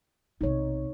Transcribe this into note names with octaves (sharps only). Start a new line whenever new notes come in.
B1 C3 D#4 C#5